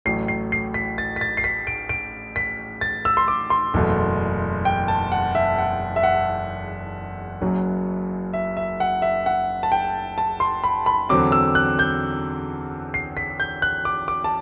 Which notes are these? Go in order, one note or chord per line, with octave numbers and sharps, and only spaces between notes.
A1 A2 F#3 C7
C7
C7
B6
A6
B6
A6
C7
B6
D7
D7
B6
A6
E6
C6
D6
C6
F#1 E2 B2 A3
G5
A5
F#5
E5
F#5
E5
F#5
F#1 F#2 F#3
E5
E5
F#5
E5
F#5
A5
G5
A5
C6
B5
B5
E2 D3 F#3 C4 D6
E6
F#6
G6
C7
B6
G6
F#6
D6
D6
A5